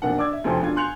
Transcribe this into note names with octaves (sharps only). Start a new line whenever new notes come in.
B1 F2 A#3 D4 F#5
D4 D5 D6 E6 G#6
E5
F1 D2 F3 C5 G5
E1 D4 F4 G#6
G#5 C6 F#6 G6 C#7 F7